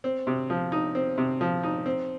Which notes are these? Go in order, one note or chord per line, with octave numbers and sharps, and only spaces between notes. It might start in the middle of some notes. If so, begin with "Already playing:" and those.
C4
C3
F3
D#4
C4
C3
F3
D#4
C4